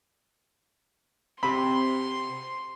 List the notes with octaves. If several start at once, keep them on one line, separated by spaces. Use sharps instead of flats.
C3 C4 B5 C6